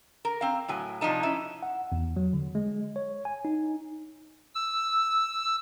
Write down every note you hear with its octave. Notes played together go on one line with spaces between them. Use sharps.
A#4
C4 F5
A2 F#3 G#5
C3 F3 D4 D#4 A5
C#4 E4
F#5
E2
F#3
D3
G#3
C#5
G#5
D#4
E6